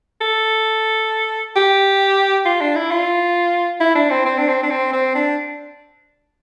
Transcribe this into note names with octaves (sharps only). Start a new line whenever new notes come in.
A4
G4
F4
D4
E4
F4
E4
D4
C4
C4
D4
C4
D4
C4
C4
D4